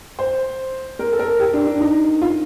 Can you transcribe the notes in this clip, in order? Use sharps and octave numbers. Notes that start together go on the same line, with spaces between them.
C5
A#4
A4
A#4
G4
D4
D4
D#4
F4